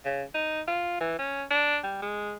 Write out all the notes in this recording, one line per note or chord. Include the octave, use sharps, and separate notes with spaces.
C#3
D#4
F4
E3
C#4
D4
G3
G#3